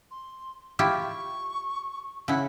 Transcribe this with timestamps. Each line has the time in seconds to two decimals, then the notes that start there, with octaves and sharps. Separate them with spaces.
0.10 C6
0.79 E4 F4 G4 C#6
2.28 C#3 E4 F#5